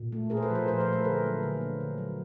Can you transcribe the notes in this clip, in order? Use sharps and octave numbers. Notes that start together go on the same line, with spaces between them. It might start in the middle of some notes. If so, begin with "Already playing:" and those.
Already playing: A#2
A3
A#2 G#4 A#4
C5
A4 B4
F3
A#4 C5
A#2 A#4 C5
A4 B4
A3
A4 B4
D3 G#4 A#4
F#3
D3
A#3
D3
F#3